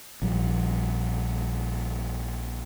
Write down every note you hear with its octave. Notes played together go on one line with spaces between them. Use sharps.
A#1 F3 G3